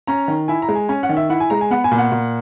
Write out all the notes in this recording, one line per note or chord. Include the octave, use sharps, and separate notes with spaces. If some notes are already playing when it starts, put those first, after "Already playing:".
C#4 A#5
D#3
E4 G#5
A#5
G#3
G#5
C#4 G#5
F#5
D#3
E5
E4 F#5
G#5
G#3 A#5
G#5
B3 F#5
G#5
A#2
F#5
A#2